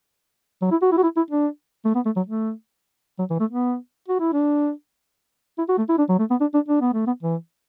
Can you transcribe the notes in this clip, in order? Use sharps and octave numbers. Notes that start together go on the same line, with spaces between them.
F#3
E4
F#4
E4
F#4
E4
E4
D4
A3
B3
A3
F#3
A3
F#3
E3
A3
B3
F#4
E4
D4
E4
F#4
A3
E4
D4
F#3
A3
B3
D4
D4
D4
B3
A3
B3
E3